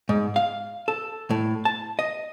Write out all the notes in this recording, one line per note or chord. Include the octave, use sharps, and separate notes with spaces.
G#2
F5
A4
A2
A5
D#5